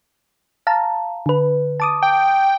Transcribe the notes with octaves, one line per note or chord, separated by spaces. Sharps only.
F5 A5 A#5
D3 B4
A5 D6 D#6
G5